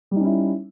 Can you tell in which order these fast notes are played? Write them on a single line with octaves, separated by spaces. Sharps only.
G3 D#4 C#4 E4